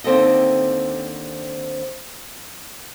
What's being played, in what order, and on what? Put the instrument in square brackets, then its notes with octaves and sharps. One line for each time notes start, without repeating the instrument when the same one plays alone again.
[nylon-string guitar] D#2 D3 C4 G4 A4 D#5